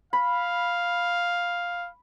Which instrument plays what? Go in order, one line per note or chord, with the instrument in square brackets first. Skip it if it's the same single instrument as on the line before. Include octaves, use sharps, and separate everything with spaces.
[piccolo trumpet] F5 [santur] B5